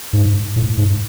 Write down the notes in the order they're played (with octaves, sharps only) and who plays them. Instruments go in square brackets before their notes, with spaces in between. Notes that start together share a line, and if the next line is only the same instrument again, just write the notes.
[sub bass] G#2
A2
G#2